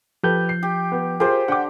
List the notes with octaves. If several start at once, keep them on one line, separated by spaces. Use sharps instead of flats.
F3 G4 A4 B4 G6
C7
G4
B3
F4 G4 G#4 A#4 C5
D3 F#5 G5 D6